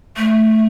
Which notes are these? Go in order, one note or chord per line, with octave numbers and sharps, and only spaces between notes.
A3